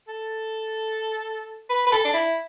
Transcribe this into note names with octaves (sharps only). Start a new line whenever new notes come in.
A4
B4
B4
A4
D4
E4